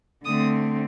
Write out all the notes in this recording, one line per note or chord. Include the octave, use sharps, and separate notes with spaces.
D3 A3 C4 D#6